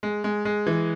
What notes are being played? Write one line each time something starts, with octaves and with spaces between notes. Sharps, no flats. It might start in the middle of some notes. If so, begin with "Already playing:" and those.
G#3
G#3
G#3
E3